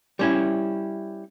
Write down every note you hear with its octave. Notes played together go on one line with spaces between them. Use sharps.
G3 C#4 E4